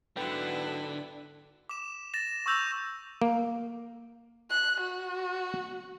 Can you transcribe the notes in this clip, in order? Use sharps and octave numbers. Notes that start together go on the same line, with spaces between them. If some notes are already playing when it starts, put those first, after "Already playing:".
G#2 D3 F#3 B3 E4 B4 G5
D6 E7
A6 A#6 E7
C#6 D6 E6 G6 A#6 F7
A#3
F#6
F#4